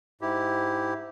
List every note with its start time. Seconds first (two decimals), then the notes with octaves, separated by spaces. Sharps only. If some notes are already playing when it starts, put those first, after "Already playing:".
0.21 G#2 E4 G4